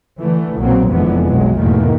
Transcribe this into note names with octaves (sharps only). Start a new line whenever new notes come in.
D3 E3 A3
A#1 B2 F#3 A#3 C4
F1 F2 D3 E3 G#3 B3
B1 B2 F#3 G#3
E2 G#2 B2 D#3 A3 A#3